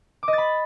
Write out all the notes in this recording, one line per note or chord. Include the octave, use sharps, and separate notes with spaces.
D6
D#5
A6
B5